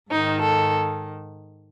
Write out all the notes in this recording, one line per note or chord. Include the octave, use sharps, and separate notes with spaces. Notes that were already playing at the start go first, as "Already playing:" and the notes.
G#2 D#3 D#4
A4